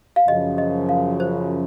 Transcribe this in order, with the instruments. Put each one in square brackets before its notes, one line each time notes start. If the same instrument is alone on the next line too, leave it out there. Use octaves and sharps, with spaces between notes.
[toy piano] F5
[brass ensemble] F#2 C#3 F3 [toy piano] D#5
[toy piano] D#5
F5
C5